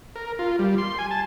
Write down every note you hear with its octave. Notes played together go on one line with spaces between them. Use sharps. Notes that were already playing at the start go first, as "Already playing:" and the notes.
A#4
F4
G3
C6
G#5
A5